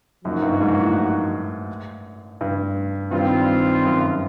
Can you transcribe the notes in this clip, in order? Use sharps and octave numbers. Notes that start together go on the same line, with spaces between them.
F#2 F3 A#3 D#4 F#4
G2
G#2
A2
G2
G2 D#3 G3 C4 F4
F#2